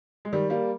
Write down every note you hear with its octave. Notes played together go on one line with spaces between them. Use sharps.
G#3
D#3 G3
G3 A#3